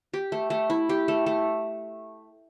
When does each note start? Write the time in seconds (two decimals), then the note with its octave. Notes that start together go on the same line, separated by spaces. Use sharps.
0.14 G4
0.32 A3
0.50 A3
0.70 E4
0.89 G4
1.08 A3
1.26 A3